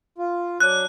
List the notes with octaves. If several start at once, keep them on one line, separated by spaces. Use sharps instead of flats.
F4
F#3 D4 F#6